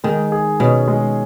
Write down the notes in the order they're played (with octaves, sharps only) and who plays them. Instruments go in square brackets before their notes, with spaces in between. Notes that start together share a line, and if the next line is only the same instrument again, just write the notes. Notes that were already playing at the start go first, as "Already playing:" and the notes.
[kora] D#3 [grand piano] G#3
[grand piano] G#4
[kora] B2 [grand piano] C#4
[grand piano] G#3